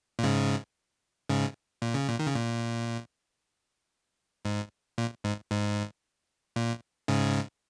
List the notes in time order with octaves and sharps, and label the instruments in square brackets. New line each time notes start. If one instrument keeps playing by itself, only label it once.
[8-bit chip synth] A#2
G#2 C#3
G#2 C#3
A#2
C#3
A#2
D#3
C#3
A#2
G#2
A#2
G#2
G#2
A#2
G#2 C#3